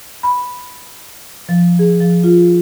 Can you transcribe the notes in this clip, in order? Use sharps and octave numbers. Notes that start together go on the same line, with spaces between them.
B5
F3
G#4
F3
F4